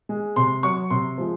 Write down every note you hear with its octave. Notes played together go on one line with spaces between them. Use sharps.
G#3
C3 C6
F#3 C#6
C3 C6
F3 G#3